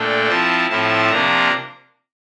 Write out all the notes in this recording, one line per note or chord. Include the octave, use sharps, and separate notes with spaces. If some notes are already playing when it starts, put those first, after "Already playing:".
Already playing: A#2 A3 D4 G5
F3 C4 E4 A5
A2 F3 C4 E4 A5
C3 F3 A#3 D4 A#5